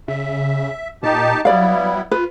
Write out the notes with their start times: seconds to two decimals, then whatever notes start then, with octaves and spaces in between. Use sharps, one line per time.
0.08 C#3 E5
1.03 A#2 D#4 G4 A5
1.45 F#3 G3 B3 E4 D5 F5
2.11 F4 B4